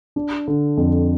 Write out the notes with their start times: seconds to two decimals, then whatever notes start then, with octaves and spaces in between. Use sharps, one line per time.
0.16 D4
0.47 D3
0.77 F2